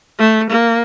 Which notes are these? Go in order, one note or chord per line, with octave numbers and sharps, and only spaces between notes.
A3
A#3